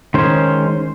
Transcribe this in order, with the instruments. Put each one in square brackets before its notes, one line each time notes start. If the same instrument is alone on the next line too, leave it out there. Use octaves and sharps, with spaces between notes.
[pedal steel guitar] D#3 G#3 C#4 C5